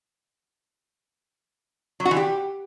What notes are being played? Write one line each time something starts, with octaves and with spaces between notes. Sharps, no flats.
F#3
F#4
E3
G4